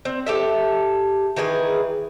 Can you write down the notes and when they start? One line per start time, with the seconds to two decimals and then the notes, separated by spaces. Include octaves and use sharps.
0.05 C4
0.27 G4 A4 E5
1.36 D#3 E3 G#4 B4